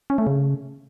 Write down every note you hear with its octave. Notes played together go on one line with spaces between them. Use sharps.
C#4
A3
C#3